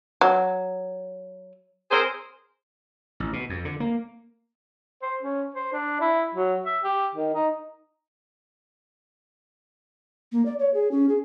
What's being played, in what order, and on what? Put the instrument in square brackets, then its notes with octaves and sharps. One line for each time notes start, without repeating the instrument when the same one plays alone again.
[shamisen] F#3
[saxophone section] G#4 A#4 C5
[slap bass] A1
B2
F2
D3
A#3
[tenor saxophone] C5
C#4
C5
D4
E4
F#3
E5
G4
D#3
D#4
[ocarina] A#3
D5
C#5
G#4
C#4
G#4